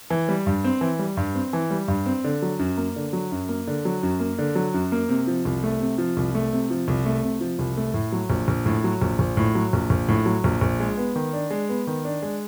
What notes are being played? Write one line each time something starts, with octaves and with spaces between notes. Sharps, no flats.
E3
G3
G2
C4
E3
G3
G2
C4
E3
G3
G2
C4
D3
F#3
F#2
A#3
D3
F#3
F#2
A#3
D3
F#3
F#2
A#3
D3
F#3
F#2
A#3
C3
F3
C2
A3
C3
F3
C2
A3
C3
F3
C2
A3
C3
F3
C2
A3
A2
F#3
A#1
A#1
A2
F#3
A#1
A#1
A2
F#3
A#1
A#1
A2
F#3
A#1
A#1
G#3
B3
D#3
D4
G#3
B3
D#3
D4
G#3